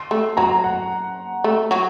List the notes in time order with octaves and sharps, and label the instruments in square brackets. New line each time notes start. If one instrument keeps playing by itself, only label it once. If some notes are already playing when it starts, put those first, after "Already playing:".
Already playing: [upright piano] C6
[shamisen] A3
[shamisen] F#3 [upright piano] A#5
[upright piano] F#5
[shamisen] A3
F#3